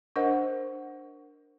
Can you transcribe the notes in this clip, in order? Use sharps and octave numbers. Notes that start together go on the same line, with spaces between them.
D4 A#4 C5 D#5 F#5